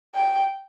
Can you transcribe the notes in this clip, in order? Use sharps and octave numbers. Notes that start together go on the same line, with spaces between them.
G5